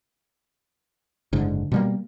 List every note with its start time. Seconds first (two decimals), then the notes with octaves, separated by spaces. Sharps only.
1.33 F#1 G#2 D3
1.72 B2 G3 A#3